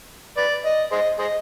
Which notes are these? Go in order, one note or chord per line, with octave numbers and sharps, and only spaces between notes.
B4 D5
D#5
G#4 C5 D#5
G#4 C5 D#5